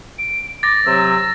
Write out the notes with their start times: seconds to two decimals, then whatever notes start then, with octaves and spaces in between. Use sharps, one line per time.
0.19 D7
0.63 D6 A6 A#6
0.85 C3 F#3 E6